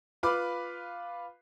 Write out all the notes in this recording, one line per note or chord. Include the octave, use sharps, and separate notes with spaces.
F4 B4 F5 B5 D6